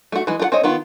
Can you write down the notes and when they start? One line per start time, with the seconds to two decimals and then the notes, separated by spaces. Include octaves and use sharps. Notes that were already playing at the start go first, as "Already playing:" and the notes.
0.12 A3 F#4
0.27 E3 G#3
0.40 F4 A#4 F#5
0.52 C4 C#5 D#5
0.63 D#3 B3 F4